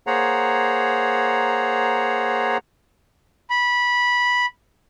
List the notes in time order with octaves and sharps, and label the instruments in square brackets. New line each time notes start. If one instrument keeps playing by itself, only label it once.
[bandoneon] A#3 G#4 C5 C#5 F#5 A#5
[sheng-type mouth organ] B5